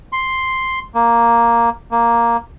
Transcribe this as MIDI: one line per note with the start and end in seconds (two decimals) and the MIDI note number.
0.12 0.79 84
0.94 1.69 58
1.91 2.37 58